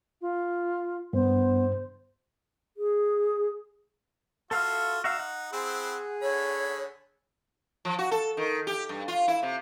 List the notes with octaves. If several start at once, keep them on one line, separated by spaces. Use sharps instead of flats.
F4
G2 B3 C5
G#4
F4 F#4 A4 E5 F5 F6
D#4 F#4 E5 F5
F#5
C4 E4 G#4 C5
D3 C#5 B5
F3
F#4
A4
D#3
G4
G2
F4
E4
C3